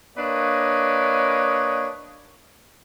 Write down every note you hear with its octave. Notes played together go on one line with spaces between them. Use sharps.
A#3 D4 B4 C#5 D#5